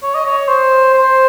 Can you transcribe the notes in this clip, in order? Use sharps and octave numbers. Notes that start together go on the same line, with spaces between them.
C#5
D#5
C#5
C5
C5